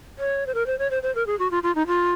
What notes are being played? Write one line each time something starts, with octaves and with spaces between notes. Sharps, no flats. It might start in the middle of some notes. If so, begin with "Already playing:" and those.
C#5
C5
A#4
C5
C#5
C5
C5
A#4
G#4
F#4
F4
F4
D#4
F4